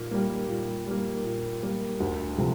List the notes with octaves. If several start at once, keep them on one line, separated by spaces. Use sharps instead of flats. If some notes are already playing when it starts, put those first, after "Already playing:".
Already playing: A#2 A#3
G3 A#3
A#2
G3 A#3
A#2
G3 A#3
D2
C3 F3 A3